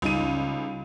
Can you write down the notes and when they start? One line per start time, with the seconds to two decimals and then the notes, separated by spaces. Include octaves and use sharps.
0.02 C#2 C#3 G3 D#4 D#7